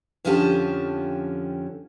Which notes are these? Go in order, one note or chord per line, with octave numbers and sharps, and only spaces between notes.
F2 D3 F3 C#4 G4 A5